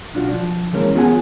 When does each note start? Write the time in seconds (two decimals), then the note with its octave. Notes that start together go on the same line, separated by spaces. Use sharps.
0.13 B1 D4 F4 F#4
0.31 F3
0.73 E3 G#3 A#3 C#4 A#4
0.95 B3 F4 G#4 A4 F#5 G#5